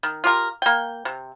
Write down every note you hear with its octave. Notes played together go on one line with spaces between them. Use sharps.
D#3
F4 G4 A#4
A#3 G5
C3